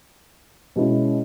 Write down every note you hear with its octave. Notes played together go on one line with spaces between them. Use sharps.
B2 G#3 C#4 E4